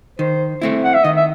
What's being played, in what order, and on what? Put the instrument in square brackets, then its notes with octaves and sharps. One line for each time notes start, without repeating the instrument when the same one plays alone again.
[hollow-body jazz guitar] D#3 [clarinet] C5
[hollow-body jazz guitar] A3 C4 E4
[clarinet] F#5
E5
[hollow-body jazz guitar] D#3 [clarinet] D#5
[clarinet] E5